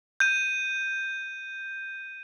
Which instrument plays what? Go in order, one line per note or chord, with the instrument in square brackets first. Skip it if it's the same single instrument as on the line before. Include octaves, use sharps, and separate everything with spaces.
[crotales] G6 D#7